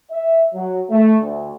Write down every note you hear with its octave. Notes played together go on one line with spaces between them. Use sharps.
E5
F#3
A3
D2